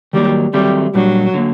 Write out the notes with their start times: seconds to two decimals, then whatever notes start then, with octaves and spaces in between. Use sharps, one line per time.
0.13 D#3 F#3 G3 A#3
0.53 D#3 F#3 G3 A3 C4
0.94 A#2 F#3 G3 D4
1.34 D3 F#3 A#3